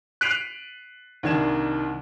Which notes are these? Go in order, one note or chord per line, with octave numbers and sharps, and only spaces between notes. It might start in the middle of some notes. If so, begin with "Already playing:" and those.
F#6 B6 C7 D7 D#7 F7
C2 D#3 D4 G#6 E7